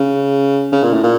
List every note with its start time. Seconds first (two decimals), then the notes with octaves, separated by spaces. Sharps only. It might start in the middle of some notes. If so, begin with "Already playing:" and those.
Already playing: C#3
0.72 C#3
0.83 A#2
0.93 A2
1.03 A#2